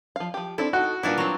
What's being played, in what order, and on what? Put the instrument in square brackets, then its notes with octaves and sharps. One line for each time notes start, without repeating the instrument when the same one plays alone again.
[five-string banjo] F3 F5
F3 G4
[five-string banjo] C4 D4 A4 [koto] E4
[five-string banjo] D#4 A4 [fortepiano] F#4
[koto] A#2 D4 E4 [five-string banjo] G3 B3 F4
[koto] F#3 C4